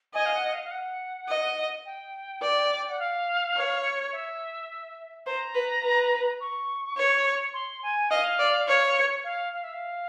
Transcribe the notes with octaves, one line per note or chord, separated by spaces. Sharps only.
D#5 G#5
F5
F#5
F5
F5
F#5
D#5
G5
D5
F#5
F5
C#5
E5
C5 A#5
B4
B4
C#6
C#5
C6
G#5
D#5 F5
D5
C#5
F5
F5
E5
F5